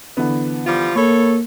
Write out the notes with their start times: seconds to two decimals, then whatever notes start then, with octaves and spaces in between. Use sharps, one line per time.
0.17 D3 E3 B3
0.66 F3 G3 F4
0.96 A#3 A4 C#5 B5